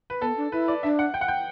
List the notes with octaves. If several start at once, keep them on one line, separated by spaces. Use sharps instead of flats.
B4
B3 A4
D4
E4 B4
D5
D4 E5
F#5
G5
F#5
G5